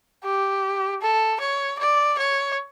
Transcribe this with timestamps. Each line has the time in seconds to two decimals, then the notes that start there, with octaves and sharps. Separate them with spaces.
0.24 G4
1.01 A4
1.40 C#5
1.79 D5
2.18 C#5